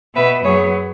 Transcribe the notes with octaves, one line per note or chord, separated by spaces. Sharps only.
B2 B3 B4 E5
F#2 F#3 B3 G#4 C#5